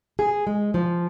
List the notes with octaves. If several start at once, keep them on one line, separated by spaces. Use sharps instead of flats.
G#4
G#3
F3